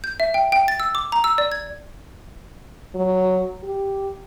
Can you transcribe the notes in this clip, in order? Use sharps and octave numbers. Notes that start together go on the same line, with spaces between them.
G6
E5
G5
G5
A6
E6
D6
A#5
E6
D5
G#6
F#3
G4